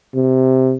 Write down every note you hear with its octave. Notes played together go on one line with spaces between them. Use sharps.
C3